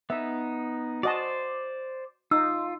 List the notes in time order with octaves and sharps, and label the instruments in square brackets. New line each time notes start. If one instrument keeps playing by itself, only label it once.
[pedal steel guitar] B3 D#4 [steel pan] E5
[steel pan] F#4 D#5 A5 [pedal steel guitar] C5 D5
[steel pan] D#4 [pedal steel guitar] F4 [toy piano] E6